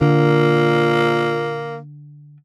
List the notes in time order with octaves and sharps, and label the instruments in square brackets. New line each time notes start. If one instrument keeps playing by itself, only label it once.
[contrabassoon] A#2 [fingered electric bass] D3 [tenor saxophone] A#3